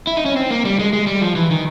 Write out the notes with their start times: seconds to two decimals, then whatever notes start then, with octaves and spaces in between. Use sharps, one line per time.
0.07 E4
0.17 D#4
0.26 C#4
0.36 C4
0.51 A#3
0.65 G3
0.79 G#3
0.93 G#3
1.07 G3
1.21 F3
1.36 E3
1.51 D#3